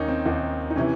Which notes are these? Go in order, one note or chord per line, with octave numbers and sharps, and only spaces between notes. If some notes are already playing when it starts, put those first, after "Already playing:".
Already playing: D#2 D#3 C#4 D#4
C4
D#2 D#3
D#4
C3 E3 C#4